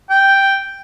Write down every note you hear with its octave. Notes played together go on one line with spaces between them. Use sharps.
G5